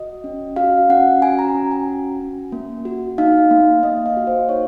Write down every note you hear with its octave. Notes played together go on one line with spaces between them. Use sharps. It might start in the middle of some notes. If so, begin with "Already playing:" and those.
Already playing: F#4 D#5
C#4
F#4 F5
C#4 F#5
F#4 G#5
A#5
C#4
G#5
F#4
C#4
A#3
F#4
D#4 F5
A#3
A#3 D#5
F5
F#4
C5
D#4 C#5